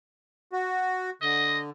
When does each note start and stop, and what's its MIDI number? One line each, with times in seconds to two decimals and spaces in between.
0.52 1.10 66
1.22 1.70 50
1.22 1.59 75